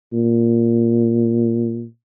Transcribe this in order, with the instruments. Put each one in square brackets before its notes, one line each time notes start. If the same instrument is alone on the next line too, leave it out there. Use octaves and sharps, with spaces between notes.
[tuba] A#2